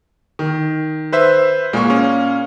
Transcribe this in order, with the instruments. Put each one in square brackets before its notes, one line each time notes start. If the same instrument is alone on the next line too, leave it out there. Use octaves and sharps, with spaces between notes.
[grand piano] D#3
[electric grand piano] B4 C5 E5
[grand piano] A#2 C#6 [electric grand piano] G#3
[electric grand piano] C#4